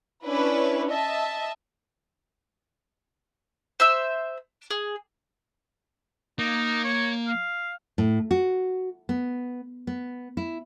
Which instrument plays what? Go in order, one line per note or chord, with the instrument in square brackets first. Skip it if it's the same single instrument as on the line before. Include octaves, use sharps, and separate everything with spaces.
[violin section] C#4 D4 E4 B4
D#5 E5 A5
[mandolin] C5 E5 E6
G#4
[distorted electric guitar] A#3 [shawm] D#4
[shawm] C#5
F5
[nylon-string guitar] A2
F#4
B3
B3
E4